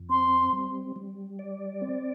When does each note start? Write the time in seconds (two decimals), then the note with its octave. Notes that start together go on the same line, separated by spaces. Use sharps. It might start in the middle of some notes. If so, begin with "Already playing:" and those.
Already playing: F2
0.09 C4 C6
0.53 G3
0.96 G3
1.39 D5
1.82 C4